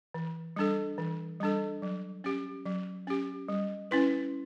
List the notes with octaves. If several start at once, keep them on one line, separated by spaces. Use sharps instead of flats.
E3
G3 D4 A4
E3
G3 D4 A4
F#3
C#4 G4
F#3
C#4 G4
G3
C#4 E4 B4